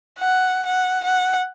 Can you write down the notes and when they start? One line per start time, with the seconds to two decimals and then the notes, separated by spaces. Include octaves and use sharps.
0.19 F#5
0.66 F#5
1.04 F#5